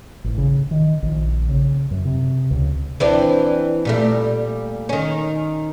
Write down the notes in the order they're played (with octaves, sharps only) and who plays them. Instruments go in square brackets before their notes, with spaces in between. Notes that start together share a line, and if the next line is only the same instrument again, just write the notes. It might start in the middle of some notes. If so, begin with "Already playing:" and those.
[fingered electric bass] A1
C#3
D#3
A#1
C#3
F#2
C3
C#2
[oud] E3 C4 D4
A#2 G3 A3
D#3 C#4